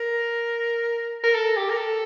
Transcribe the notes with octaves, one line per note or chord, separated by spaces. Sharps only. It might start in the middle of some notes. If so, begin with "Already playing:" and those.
Already playing: A#4
A#4
A4
G4
A#4
A4